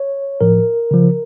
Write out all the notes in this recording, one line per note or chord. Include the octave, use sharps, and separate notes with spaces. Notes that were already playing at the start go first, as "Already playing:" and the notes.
Already playing: C#5
A2 F3 A#4
C#3 F3